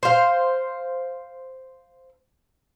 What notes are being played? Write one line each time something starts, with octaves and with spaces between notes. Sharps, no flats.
C5 F5